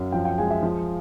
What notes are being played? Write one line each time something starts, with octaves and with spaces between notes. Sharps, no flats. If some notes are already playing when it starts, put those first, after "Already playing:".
Already playing: F#2
F3 G5
G5
G#3 G#5
E5
F3 F5